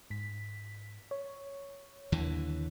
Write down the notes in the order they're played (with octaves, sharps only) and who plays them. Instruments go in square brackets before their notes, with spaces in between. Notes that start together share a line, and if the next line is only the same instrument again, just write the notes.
[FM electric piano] G#2 B6
C#5
[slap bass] D#2 D3 E3